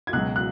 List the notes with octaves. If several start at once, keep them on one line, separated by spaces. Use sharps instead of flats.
G#6
C#2 B2 F#3 F#6
F#6